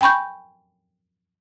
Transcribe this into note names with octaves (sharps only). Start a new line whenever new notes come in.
G5 G#5 B5 C#6 G6